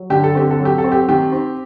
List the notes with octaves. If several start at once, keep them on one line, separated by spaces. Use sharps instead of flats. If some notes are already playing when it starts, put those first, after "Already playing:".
Already playing: F#3
D3 G4
A4
C4 G4
A4
F#3
G4
A4
C4
G4
D#3 G4
C4